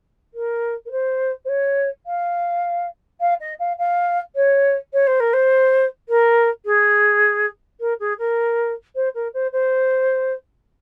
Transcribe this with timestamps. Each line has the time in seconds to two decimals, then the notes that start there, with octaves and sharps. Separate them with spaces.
0.34 A#4
0.85 A#4
0.91 C5
1.45 C5
1.49 C#5
2.06 F5
3.21 F5
3.40 D#5
3.59 F5
3.78 F5
4.35 C#5
4.93 C#5
5.07 C5
5.20 A#4
5.33 C5
6.09 A#4
6.65 G#4
7.80 A#4
8.00 G#4
8.19 A#4
8.95 C5
9.14 A#4
9.34 C5
9.52 C5